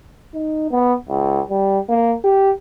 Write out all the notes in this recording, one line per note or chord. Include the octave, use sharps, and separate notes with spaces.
D#4
B3
C#2
G3
A#3
G4